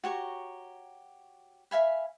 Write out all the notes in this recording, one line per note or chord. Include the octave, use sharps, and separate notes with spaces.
F#4 G4 C#5 A#5
E5 F5 G#5 B5